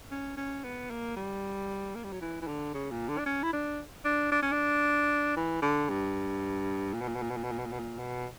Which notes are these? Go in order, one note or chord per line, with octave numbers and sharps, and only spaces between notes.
C#4
C#4
B3
A#3
G3
A#3
G3
F#3
E3
E3
D3
C#3
A#2
D3
D4
C#4
E4
D4
D4
D4
C#4
D4
E3
D3
G2
A#2
B2
A#2
B2
A#2
B2
A#2
B2
A#2
B2
A#2
B2
A#2
B2